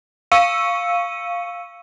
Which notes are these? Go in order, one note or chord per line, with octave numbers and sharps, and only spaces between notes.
F5 C#6 E6 C#7 D#7